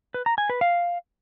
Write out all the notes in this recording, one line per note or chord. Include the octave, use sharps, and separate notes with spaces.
B4
A#5
G#5
B4
F5